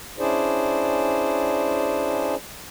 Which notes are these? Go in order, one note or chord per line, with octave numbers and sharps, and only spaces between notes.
C#4 D4 E4 G#4 C5 D5